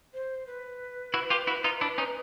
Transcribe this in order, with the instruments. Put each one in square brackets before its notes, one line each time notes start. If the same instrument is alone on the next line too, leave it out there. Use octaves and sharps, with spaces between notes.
[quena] C5
B4
[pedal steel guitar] E4 F#4
F4 G4
E4 F#4
D#4 F4
D4 E4
C#4 D#4